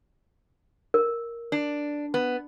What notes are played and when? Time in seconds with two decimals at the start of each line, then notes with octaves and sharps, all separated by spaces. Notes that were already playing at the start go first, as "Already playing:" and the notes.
0.94 A#4
1.52 D4
2.14 B3